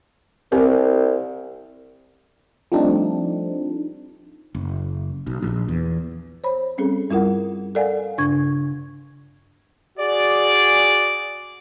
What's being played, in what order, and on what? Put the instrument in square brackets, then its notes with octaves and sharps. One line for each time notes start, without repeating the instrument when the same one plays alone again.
[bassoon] C2 [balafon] C4 G4 A#4
[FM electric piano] F3 G3 A3 C4 D4 D#4
[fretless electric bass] F#1
B1
A#1
E2
[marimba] C5 C#5 B5
G3 C4 C#4 G#4 A4
G2 G3 E4 F4 A#4 F#5
A4 A#4 D5 F5 F#5 G#5
G2 C#3 D4 C#6 G#6
[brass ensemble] F#4 G#4 D5